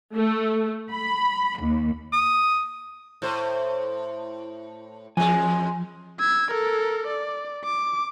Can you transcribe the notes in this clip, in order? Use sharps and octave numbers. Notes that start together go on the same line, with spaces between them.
A3
B5
D#2
D#6
A2 C5
F2 F3 G#3 G#5
E6 G#6
A4 A#4
D5
D6